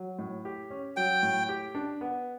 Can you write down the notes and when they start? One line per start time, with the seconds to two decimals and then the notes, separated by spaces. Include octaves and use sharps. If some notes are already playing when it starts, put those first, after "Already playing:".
Already playing: F#3
0.19 A2
0.45 G4
0.70 C#4
0.96 F#3 G5
1.23 A2
1.49 G4
1.75 D4
2.01 B3